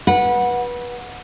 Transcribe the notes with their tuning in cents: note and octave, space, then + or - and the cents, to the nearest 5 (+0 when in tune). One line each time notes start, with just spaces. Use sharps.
B4 -25 F#5 -15